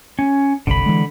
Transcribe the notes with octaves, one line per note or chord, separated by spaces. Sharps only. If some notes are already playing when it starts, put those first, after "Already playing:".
C#4
G1 C2 D3 B5
E3 G#3